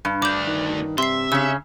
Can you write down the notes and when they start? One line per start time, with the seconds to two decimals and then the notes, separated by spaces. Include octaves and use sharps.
0.05 G2
0.22 D2 D4 D6 G6
0.47 D#3
0.98 C3 E5 C6 C7
1.32 C#3 C#4 E6